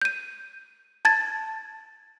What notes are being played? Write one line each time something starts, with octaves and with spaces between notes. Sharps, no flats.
G6 D#7
A5 G#6 A6